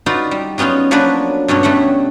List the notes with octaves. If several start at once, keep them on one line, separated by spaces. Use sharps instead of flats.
D#4 F4 F#4 B4 D5
G3
F#3 B3 C#4 D#4 F4
F3 F#3 A#3 B3 D4 B4
G2 B2 F#3 C#4 D4
B2 G3 A3 E5 F#5